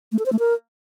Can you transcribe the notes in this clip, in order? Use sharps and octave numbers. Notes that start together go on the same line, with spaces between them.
A3
A4
C5
A3
A#4